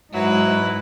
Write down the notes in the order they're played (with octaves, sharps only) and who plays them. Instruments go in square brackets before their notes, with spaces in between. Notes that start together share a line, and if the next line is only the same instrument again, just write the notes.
[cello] G#2 [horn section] F#3 [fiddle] E4 B4